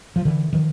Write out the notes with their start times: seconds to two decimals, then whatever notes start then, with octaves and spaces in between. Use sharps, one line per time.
0.16 F3
0.25 D3 E3
0.53 D#3 F3